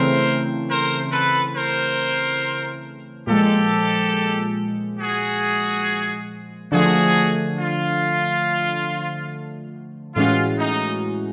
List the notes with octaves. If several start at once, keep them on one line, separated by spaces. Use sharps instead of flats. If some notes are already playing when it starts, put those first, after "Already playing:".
Already playing: C#3 E3 A3 C4 A#4 C5
A#4 C5
A4 B4
A#4 C5
A#2 F3 G#3 G4 A4
F#4 G#4
D3 F3 A3 F#4 G#4
F4
A2 E3 G#3 C#4 F4 F#4
D#4